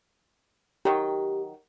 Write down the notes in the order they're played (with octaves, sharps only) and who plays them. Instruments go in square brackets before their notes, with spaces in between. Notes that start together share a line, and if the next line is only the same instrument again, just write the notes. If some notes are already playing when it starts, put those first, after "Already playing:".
[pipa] D#3 F#3 [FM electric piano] G4